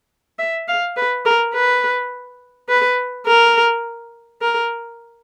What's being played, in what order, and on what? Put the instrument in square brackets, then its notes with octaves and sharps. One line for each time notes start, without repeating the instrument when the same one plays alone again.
[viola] E5
F5
B4
A#4
B4
B4
A#4
A#4